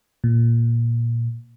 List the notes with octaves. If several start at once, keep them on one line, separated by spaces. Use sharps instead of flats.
A#2